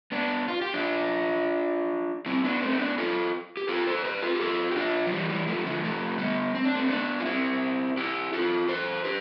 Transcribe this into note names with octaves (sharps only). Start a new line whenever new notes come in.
B3 D4
F4
G4
D4 F4
C4 E4
B3 D4
A3 C4
C4
B3 D4
F4 A4
G4
F4 A4
A4 C5
G4 B4
F4 A4
G4
F4 A4
G4
D4 F4
F3
E3 G3
E3 G3
F3 A3
D3 F3
F3 A3
G3 B3
C4
D4
A3 C4
B3 D4
F4
C4 E4
E4 G4
F4 A4
A4 C5
G4 B4